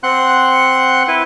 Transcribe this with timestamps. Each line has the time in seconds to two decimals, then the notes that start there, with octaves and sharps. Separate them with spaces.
0.03 C4 F#5 C6 F#6
1.08 E4 B4